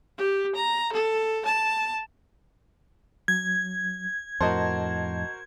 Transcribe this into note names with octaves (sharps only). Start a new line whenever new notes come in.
G4
A#5
A4
A5
F#3 G#6
F2 A2 F#4 A#4 C5 D#5 A5